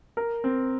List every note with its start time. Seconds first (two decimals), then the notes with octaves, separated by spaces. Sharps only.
0.17 A#4
0.44 C4